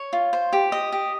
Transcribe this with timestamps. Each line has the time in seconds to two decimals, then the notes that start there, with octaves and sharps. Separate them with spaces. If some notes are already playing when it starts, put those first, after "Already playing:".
Already playing: C#5
0.13 F4
0.33 C5
0.53 G4
0.72 D#5
0.92 G4